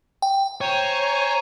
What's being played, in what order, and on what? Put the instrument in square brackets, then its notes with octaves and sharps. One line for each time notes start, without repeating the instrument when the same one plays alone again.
[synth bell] G5
[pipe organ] C5 G#5 A#5 [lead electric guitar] C#5